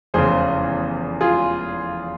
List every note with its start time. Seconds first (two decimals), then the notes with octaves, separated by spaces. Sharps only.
0.14 F1 E2 C#3 G#4 C5
1.21 F4 G#4